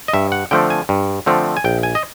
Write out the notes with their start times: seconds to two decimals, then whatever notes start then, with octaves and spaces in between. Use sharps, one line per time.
0.08 D#5
0.13 G2 E5
0.32 F#5
0.51 D3 F3 A3 C4 G5
0.70 G#5
0.89 G2
1.26 D3 F3 A3 C4
1.57 G#5
1.64 A#1 G5
1.83 G#5
1.95 D#5